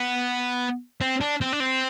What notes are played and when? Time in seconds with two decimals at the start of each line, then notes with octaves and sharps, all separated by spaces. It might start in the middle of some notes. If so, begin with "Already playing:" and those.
Already playing: B3
1.01 C4
1.21 D4
1.41 C4
1.53 D4
1.60 C4